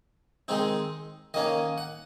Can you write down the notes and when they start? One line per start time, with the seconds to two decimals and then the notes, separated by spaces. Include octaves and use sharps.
0.48 D#3 G#3 C4 D#4
1.34 D#3 A#3 C#4 D#5
1.78 F#5